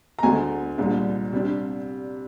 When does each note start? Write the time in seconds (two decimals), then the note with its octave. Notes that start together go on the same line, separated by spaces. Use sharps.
0.19 A#5
0.23 D2 D3 G#3 G#5
0.78 C2 A#2 G#3 D4
1.33 C3 G3 D4